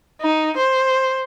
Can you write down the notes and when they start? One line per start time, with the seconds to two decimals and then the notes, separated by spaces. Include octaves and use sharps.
0.21 D#4
0.57 C5